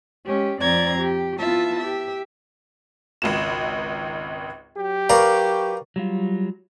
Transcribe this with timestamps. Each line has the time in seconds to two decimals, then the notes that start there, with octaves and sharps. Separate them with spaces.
0.25 G#3 C#4 G4
0.60 F2 C4 D5 A#5 G#6
0.98 G4
1.38 B3 E4 F4 E5 A5
1.79 G4 E5
3.22 G#1 C#2 E7
4.76 F#3 G4
5.09 A#4 B4 D5 F5 C#6
5.96 F#3 G3 F4